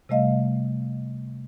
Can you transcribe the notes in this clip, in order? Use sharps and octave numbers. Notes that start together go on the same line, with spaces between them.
C3 G3 A3 D#5 F5